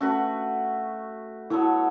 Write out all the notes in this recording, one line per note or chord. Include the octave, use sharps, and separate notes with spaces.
A3 C#4 F#4 B4
F#3 B3 E4 A4 C#5